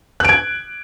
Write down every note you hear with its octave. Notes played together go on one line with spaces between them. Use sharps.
F#6 G#6 D7